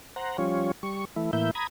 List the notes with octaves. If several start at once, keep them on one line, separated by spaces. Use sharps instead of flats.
C5 F#5 A#5
F3 G3 C#4 F4 C#5
G3 C#6
E3 A3 E4
A2 E3 A#3 E4 E5 G6
A#5 B5 D#6 G#6